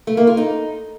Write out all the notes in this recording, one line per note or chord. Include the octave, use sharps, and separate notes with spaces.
A3
A#3
F4
D#4